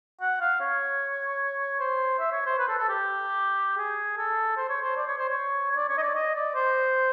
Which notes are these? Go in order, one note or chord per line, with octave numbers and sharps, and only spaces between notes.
F#5
F5
C#5
C5
E5
C#5
C5
B4
A4
A4
G4
G#4
A4
C5
C#5
C5
D5
C#5
C5
C#5
C#5
D5
C#5
D#5
D5
D#5
D5
C5